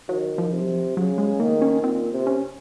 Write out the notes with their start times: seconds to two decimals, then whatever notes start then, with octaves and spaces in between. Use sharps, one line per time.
0.09 D#3 F#3
0.38 F3
0.53 C3
0.61 F#3
0.67 F3
0.97 C#3 F#3
1.18 G#3
1.39 D#3 A#3
1.62 C#4
1.83 A#2 C4
2.12 C3
2.27 C#4